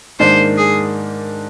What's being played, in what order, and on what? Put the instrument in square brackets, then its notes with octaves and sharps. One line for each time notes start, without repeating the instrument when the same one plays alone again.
[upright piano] G#2 D#3 A#3 D4 [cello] C5
[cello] G#4